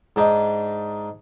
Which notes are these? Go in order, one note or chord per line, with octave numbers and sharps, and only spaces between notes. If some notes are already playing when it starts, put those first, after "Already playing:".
G#2 D4 D#4